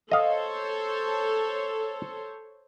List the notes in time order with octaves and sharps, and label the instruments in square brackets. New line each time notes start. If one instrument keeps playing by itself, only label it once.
[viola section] A4 C5 C#5 [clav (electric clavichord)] D#5 F5